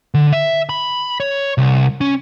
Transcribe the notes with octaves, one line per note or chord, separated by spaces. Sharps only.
D3
E5
B5
C#5
C2
C#4